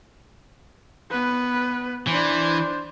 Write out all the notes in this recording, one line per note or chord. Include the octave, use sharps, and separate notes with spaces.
B3 B4
E3 D4 C5